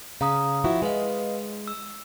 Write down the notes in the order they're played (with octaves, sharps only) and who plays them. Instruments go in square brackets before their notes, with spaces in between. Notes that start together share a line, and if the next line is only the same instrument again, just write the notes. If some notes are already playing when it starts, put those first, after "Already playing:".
[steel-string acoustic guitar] C#3 [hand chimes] F5 A#5 D#6
[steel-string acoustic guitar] F3 E4 F#4
[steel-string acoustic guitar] G#3 [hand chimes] B4 D#5 F5
[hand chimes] E6